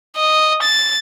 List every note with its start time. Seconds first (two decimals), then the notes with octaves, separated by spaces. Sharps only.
0.16 D#5
0.62 A6